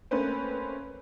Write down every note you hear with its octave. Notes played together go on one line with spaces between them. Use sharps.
A3 A#3 C4 C#4 B4 C5